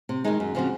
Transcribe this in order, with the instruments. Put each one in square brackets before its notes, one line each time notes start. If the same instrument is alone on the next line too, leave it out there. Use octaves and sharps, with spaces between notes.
[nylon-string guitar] C3
D#3 G#3 D#4
F#2
C#3 F3 C4 F#4